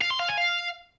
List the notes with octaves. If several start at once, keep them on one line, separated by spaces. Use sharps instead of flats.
F5
C6
F5
G#5
F5